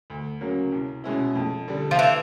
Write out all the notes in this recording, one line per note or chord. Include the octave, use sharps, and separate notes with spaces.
D2
C#3 F#3 A#3
C2
B2 G#3 C#4 E4
F2
D3 G3
F3
E3